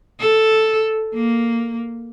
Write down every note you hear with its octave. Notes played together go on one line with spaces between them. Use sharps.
A4
A#3